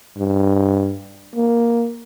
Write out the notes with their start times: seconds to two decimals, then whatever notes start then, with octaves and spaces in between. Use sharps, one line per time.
0.17 G2
1.35 A#3